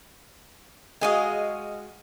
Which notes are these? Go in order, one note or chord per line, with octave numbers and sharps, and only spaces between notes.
G#3 F#4 G#4 D#5 F5